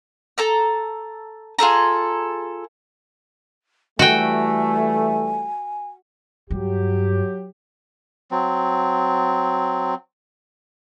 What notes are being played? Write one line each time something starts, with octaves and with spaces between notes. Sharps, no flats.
A4 A#5 E6
F4 G#4 A4 A#5
E3 G3 A3 F#4 G5 G#5
G2 F#3 G4
F#3 C4